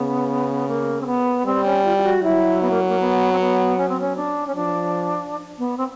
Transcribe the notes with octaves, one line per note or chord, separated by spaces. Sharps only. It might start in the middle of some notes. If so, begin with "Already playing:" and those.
Already playing: C#3 B3
A#3
C4
B3
G3 C4
C#4
F4
F4
F#4
F#3 E4
B3
A#3
A#3
B3
C4
B3
C#4
C4
C#4
D4
C#4
F3 D4
B3
C4